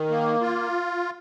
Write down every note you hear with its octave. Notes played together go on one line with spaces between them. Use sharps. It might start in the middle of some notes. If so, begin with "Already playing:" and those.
Already playing: D#3
A#3
F4